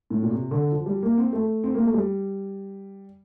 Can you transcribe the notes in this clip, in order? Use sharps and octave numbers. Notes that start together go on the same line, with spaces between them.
A2
A#2
C3
D3
F3
G3
A#3
C4
A3
C4
A#3
A3
G3